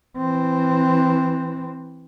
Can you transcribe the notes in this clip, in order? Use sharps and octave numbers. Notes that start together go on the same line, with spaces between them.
E3 C4